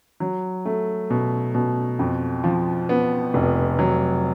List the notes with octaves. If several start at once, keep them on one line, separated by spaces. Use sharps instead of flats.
F#3
A3
B2
B2
F2
F3
B3
F1
F#3